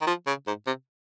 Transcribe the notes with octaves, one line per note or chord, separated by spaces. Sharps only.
D#3
F3
C#3
G#2
C3